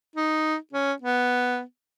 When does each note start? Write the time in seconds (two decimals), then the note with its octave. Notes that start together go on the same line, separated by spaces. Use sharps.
0.16 D#4
0.73 C#4
1.02 B3